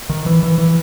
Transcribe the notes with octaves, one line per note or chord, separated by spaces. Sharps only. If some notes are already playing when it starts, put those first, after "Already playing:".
D#3
E3
E3
E3